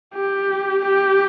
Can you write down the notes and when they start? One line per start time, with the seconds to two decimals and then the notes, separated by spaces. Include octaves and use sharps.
0.14 G4
0.85 G4